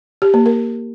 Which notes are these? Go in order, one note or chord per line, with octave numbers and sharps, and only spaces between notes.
G4
A#3
A#4